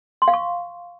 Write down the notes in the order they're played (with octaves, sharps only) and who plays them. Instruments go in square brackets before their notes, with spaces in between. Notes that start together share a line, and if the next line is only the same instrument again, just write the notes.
[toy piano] C6
F5
C#6